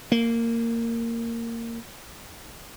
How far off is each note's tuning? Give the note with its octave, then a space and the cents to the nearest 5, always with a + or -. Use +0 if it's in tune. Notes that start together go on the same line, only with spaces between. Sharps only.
A#3 -15